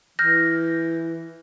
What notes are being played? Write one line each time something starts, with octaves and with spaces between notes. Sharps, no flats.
E3 F6 G6 A#6